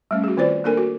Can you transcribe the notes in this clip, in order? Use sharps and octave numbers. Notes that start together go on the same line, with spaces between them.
G3 A3 C#4
F#4 G#4
D#3 C4 F4 C5 D5
A#3 D4 A4 A#4 G#5
F#4